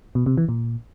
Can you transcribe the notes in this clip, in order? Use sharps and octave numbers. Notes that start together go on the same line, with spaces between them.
B2
C3
E3
A#2